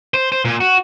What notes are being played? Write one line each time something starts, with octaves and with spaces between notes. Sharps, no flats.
C5
C5
A#2
F#4